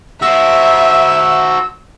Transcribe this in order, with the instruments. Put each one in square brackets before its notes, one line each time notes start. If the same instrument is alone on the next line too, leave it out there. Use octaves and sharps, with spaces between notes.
[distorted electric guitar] F#4 C5 [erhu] E5 [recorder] E6